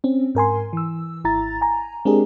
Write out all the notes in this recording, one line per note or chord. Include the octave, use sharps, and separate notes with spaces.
C4 C#4
G#2 A#4 G#5 C6
E3 E6
G#1 E4 A#5 A6
G#5 A#5
G#3 C4 D4 G4 G#4 A#4